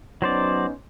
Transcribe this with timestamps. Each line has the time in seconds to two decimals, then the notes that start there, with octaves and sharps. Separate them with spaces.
0.22 F#3 B3 C#4 D#4 C5 D5